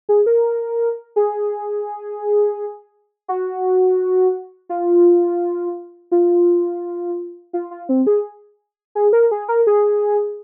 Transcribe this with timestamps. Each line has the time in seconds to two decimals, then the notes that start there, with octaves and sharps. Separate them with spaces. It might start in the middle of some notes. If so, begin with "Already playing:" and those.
0.09 G#4
0.26 A#4
1.16 G#4
3.28 F#4
4.69 F4
6.12 F4
7.53 F4
7.71 F4
7.89 C4
8.07 G#4
8.95 G#4
9.13 A#4
9.31 G#4
9.48 A#4
9.67 G#4